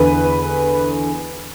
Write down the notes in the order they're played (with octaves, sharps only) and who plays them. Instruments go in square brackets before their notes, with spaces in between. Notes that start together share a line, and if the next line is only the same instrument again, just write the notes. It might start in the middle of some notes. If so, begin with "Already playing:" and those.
Already playing: [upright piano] E2 D3 B4